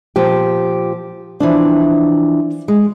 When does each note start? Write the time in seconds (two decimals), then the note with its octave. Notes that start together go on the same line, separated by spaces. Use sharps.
0.16 A#2 F3 G4
1.40 E3 F3 D4
2.68 G#3